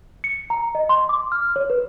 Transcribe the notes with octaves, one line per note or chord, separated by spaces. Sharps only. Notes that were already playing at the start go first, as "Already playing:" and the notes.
C#7
A#5
D#5
C6
D6
F6
C#5
B4